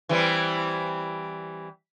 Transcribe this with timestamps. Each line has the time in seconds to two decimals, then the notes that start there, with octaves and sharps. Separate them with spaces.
0.09 E3 G3 C4